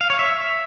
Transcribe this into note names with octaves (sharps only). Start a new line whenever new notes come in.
F5
C#5
E5